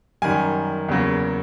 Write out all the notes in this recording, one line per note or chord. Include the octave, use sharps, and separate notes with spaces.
F#2 D#3 G3 G#5
E2 C#3 F#3 A#3